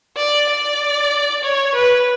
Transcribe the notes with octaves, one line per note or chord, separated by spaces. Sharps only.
D5
D5
C#5
B4